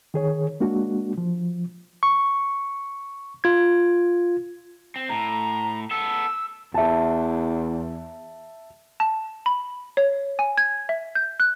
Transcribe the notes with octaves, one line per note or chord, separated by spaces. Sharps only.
D#3 G#4 C#5
G#3 A#3 D4 F#4
F3
C#6
F4 G#6
C4
A2 A#5
B3 A4 E6
E2 E5 A5
A5
B5
C#5
G#5
G#6
E5
G6
F#6